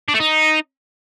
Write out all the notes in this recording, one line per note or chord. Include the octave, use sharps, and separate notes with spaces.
D4
A3
D#4